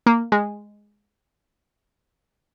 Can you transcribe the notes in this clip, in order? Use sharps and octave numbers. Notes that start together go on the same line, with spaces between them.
A#3
G#3